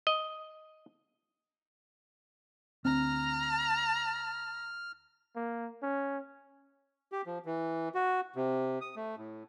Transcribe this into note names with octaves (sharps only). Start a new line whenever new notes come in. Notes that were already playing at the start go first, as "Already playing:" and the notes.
D#5
D2 C4 A#5 F6
A#3
C#4
G4
F3
E3
F#4
C3
D#6
A3
A2